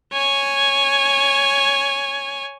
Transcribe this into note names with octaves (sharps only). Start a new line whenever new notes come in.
C#5 G#5